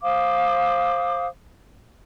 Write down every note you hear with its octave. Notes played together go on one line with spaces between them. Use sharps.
C5 F5 D6 D#6